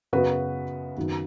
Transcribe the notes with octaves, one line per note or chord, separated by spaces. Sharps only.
F#2 C#3 B3 F#4 B4
F#2 D#3 B3